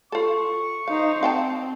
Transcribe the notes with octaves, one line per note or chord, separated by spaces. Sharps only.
F4 A4 C#6
D#4 C5 F5
C4 F5 G5 A5